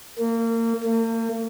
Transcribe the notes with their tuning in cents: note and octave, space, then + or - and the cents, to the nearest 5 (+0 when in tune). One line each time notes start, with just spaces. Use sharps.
A#3 -30
A#3 -45